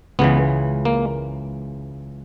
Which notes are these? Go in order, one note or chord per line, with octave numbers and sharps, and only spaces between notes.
C#2 C#3 E3 B3
A#3